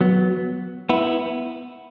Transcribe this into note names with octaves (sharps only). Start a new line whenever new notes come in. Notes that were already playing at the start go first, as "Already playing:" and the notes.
F#3 B3
B3 E4